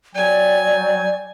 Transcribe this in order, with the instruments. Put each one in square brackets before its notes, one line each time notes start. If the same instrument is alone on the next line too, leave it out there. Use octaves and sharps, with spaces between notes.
[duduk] F#3 [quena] D5 [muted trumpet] G5 [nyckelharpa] G#5